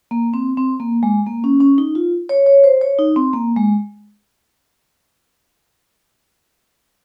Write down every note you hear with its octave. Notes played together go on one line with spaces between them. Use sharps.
A#3
C4
C4
A#3
G#3
A#3
C#4
C#4
D#4
F4
C#5
C#5
C5
C#5
D#4
C4
A#3
G#3